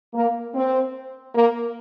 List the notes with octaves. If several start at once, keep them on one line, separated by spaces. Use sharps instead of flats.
A#3
C4
A#3